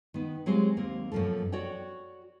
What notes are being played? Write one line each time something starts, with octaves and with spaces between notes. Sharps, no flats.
D#3 B3
F#3 G#3 C4 F4 G4 C5
D#2 A#3 C4
F#2 B2 F3 A#3 A4
F#4 C#5 D5 G5